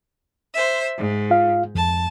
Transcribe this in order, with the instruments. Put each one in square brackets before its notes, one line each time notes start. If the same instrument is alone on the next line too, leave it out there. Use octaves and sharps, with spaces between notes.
[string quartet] C5 E5
G#2
[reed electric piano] F4 F5
[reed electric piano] F2 [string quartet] A5